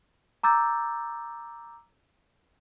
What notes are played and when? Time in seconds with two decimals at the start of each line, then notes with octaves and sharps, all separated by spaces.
0.43 A#5 D6 E6 G6 A6